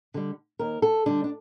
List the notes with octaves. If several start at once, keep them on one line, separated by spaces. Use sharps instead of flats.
D3 G3
D#2 A#4
A4
D3 G3 D4
D4